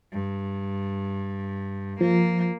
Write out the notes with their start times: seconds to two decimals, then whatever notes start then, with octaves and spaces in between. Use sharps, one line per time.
0.13 G2
2.01 F3 A#3